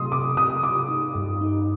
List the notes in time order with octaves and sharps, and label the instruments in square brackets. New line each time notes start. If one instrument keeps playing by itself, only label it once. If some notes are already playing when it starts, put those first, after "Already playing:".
Already playing: [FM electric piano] C3 F#3 A3 [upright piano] C6 D#6
[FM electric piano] C3 [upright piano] D6
[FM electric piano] C3 [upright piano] D#6
[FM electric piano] C3 [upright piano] D6
[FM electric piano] D#4
G2
D#4